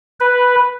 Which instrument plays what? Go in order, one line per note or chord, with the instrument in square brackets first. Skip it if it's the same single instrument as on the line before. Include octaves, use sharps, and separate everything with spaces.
[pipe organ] B4